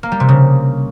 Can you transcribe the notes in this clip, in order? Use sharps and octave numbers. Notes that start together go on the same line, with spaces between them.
A#3
G3
C3
C#3